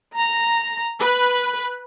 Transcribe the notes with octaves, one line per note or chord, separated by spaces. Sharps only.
A#5
B4